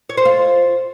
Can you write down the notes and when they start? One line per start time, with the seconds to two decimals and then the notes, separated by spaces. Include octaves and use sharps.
0.09 C#5
0.17 C5
0.25 F4